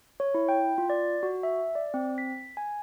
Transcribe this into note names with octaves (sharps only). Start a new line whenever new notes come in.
C#5
E4
G5
F4
D5
F#4
E5
D5
C4
B6
G#5